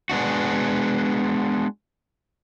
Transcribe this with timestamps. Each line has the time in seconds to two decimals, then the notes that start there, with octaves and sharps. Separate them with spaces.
0.10 G#3 B3 D4 F#4